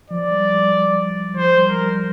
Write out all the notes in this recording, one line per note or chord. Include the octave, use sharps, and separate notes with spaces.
F3 D5
G3
G3
F3 C5
G3
A#4
G3